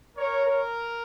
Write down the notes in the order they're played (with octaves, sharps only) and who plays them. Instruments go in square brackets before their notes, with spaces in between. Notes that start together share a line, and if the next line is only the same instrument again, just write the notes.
[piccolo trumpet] A#4 [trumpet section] C#5
[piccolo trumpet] A#4